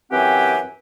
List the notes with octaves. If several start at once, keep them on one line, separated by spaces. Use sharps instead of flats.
F#2 E3 C4 G4 F#5 G#5